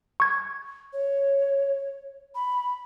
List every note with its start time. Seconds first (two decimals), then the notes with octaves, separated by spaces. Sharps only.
0.20 C#6 G#6
0.93 C#5
2.35 B5